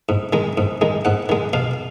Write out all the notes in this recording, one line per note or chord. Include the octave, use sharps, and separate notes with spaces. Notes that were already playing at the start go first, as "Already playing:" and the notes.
G#2
D#3 G#3
G#2
D#3 G#3
G#2 F#5
D#3 G#3
B2 F5